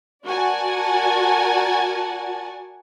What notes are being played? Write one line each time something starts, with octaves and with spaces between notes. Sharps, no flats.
F#4 A#4 D5 F#5 G#5 A5